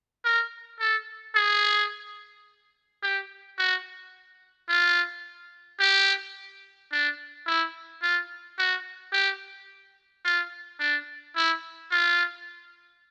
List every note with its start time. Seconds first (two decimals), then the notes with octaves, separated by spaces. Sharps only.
0.25 A#4
0.80 A4
1.35 G#4
3.03 G4
3.59 F#4
4.69 F4
5.80 G4
6.92 D4
7.47 E4
8.03 F4
8.59 F#4
9.13 G4
10.25 F4
10.80 D4
11.36 E4
11.91 F4